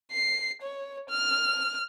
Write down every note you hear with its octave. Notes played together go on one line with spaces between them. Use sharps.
C7
C#5
F6